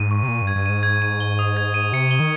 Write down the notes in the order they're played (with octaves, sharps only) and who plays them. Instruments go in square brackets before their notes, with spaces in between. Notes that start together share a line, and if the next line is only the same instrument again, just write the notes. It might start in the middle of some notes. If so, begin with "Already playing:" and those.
Already playing: [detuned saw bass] G#2 [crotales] D#7
[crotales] C#6
[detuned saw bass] C3
[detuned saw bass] A#2 [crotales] C#6
[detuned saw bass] G2
[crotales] G#6
[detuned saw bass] G2
[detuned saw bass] G#2 [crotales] D#7
[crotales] G#6
D#7
G7
D#6
G#6
D#7
[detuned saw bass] C3 [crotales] C#7
[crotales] G7
[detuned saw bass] D#3